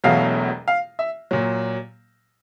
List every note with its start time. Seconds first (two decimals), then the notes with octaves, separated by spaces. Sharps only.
0.04 E1 E2 B2 F#3 A3 F5
0.68 F5
0.99 E5
1.31 A#2 F#3